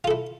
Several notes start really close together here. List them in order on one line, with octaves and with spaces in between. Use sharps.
F4 A4 E4